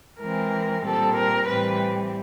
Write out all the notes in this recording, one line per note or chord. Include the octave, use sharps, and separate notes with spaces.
E3 G#3 C4 A#4
A#2 G3 C4 A4
A#4
A2 E3 G3 C4 B4